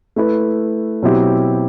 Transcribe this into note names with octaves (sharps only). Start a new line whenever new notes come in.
A3 E4 B4
B2 F#3 C4 E4 G4